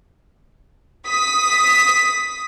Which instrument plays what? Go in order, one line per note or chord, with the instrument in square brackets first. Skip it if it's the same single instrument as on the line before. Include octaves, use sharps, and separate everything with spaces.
[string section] D#6 B6